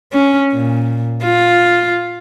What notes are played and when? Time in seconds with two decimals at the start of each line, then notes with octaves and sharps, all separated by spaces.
0.12 C#4
0.53 A#2
1.24 F4